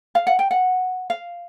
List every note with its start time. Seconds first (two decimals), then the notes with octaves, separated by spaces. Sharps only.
0.15 F5
0.27 F#5
0.39 G5
0.51 F#5
1.10 F5